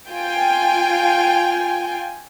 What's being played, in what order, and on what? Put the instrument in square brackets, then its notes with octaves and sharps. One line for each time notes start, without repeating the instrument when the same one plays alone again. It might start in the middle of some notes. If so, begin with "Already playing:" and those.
[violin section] F4 G5 G#5